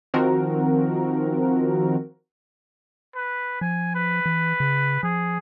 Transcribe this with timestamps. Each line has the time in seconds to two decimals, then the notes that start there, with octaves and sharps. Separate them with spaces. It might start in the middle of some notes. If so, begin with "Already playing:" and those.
0.14 D#3 F3 C4 F#4 A#4
3.14 B4
3.61 F3 G#5
3.95 B4
4.26 E3
4.60 C#3
5.03 F3 G#4